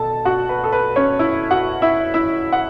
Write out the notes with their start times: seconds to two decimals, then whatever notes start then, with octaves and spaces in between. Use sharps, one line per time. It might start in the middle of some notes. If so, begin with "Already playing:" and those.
Already playing: B2 A4 A5
0.25 F#4 F#5
0.49 B4
0.64 A4
0.72 B4
0.96 C#4 C#5
1.19 E4 E5
1.51 F#4 F#5
1.82 E4 E5
2.14 E4 E5
2.53 F#5